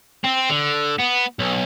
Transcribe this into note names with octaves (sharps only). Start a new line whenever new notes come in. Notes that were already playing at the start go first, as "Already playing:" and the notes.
C4
D3
B3
B1